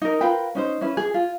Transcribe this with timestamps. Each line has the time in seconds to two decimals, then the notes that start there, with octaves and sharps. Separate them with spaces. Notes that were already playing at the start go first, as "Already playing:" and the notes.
0.02 D#4 A#4
0.21 F4 A#4 B4 G5
0.55 C#4 D#4 C5
0.81 C#4 E4 B4
0.97 G#4
1.14 F4